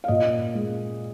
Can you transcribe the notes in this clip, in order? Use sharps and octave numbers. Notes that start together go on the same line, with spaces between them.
F5
A#2 D#5
G#3